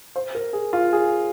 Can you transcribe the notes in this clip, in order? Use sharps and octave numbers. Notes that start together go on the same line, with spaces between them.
C5
A#4
G#4
F4
G#4